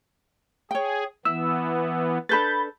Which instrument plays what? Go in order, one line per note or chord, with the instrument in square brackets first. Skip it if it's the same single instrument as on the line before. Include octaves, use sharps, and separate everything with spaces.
[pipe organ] G#4 [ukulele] C#5 G5
[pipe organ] E3 B3 [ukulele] E4 [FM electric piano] E6
[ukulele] D4 A4 B4 [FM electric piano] B5 G6 A6